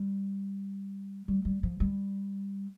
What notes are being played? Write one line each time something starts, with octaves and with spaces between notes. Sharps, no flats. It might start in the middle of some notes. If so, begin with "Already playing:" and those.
Already playing: G3
G3
G3
F3
G3